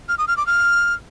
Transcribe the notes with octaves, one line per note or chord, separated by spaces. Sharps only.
F6
D#6
F6
D6
F6